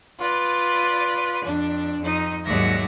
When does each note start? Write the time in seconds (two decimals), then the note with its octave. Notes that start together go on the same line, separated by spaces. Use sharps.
0.20 F4 B4 D5
1.45 F2 D4
2.00 F2 D#4
2.45 D#2 G#2 F#3 D5 E5 A#6